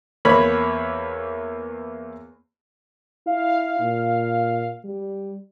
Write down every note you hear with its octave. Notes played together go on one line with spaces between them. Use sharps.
E2 A#3 C#5 B5
E4 F5
A#2
G3